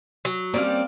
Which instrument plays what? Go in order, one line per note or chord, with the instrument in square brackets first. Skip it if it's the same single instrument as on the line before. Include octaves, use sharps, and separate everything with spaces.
[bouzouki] F#3
[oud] G3 C#4 [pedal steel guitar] A#3 C4 F5 [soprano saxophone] D5